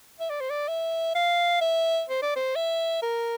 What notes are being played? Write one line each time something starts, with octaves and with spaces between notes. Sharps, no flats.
E5
D5
C5
D5
E5
F5
E5
C5
D5
C5
E5
A#4